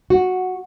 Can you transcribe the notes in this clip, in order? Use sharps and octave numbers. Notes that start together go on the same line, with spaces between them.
F#4